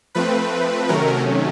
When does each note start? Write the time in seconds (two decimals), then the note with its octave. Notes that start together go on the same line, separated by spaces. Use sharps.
0.15 F3 A3 C4 B4
0.89 C3 D#3 F#3 A3 C#4 A#4